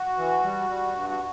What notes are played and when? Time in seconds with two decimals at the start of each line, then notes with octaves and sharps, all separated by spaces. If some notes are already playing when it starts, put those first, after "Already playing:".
Already playing: F#4
0.17 E3
0.44 G3
0.69 G3
0.95 G2
1.10 F#4